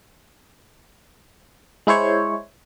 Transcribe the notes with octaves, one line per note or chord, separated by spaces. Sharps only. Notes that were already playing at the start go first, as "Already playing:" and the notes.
G#3 E4 C5 C#5